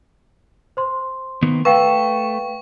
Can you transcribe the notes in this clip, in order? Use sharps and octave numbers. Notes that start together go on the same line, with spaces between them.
C5 C6
D#3 A#3 B3
A3 B4 F5 G5 A5 C#6